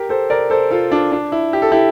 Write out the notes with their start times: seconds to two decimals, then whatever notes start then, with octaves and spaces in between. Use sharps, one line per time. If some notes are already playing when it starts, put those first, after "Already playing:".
Already playing: G4 A#4
0.09 A4 C5
0.30 A#4 D5
0.50 A4 C5
0.71 F4 A4
0.91 D4 F4
1.12 D4
1.32 E4
1.53 G4
1.62 A4
1.72 E4 G4